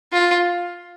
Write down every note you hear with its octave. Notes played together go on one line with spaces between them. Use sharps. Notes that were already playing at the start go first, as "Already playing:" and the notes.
F4